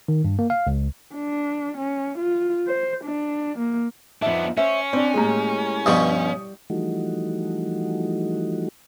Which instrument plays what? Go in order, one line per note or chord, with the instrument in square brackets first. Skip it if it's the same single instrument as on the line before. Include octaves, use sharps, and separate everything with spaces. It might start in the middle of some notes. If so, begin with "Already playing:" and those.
[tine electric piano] D#3
G2
A#3
F5
C#2
[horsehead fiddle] D4
C#4
F4
C5
D4
A#3
[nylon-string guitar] F2 D#4 E5 [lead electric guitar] B3 D4
[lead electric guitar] C#4 [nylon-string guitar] C5 E5
[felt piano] C4 D4 [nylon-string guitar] D5
[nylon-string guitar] A2 A#3 G4 [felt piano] G#3 A#5
[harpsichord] G2 B2 F3 [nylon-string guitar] G3 [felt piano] C#6 D#6
[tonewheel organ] E3 F3 G3 A3 D#4 F#4